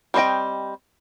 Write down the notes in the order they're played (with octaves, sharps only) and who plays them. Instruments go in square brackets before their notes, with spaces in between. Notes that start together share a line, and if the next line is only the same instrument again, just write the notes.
[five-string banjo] G3 C4 C5 D#5 G5